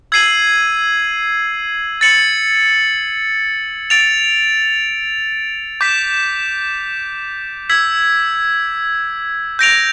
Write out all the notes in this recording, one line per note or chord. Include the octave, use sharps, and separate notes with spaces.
E6 G#6 C7 D#7 F#7
A6 C#7 F#7
A6 D7 F7
D6 G6 B6
E6 G#6 B6
G6 A#6 D7 F7